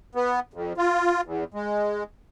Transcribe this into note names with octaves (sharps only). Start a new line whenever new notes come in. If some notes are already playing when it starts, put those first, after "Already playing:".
B3
F2
F4
E2
G#3